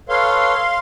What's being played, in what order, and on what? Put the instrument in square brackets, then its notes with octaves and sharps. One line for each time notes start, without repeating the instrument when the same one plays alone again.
[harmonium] A4 B4 C#5 [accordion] F5 C6